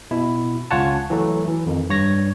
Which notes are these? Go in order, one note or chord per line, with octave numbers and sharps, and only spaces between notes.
B2 E4
C#2 C#4 F4 C#5 F#5 A5
E3 F#3 A3
E3
F2 D#3
G2 C#5 A#6